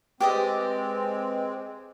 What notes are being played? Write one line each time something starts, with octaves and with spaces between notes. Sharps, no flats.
G#3 C4 G4 B4 D5 D#5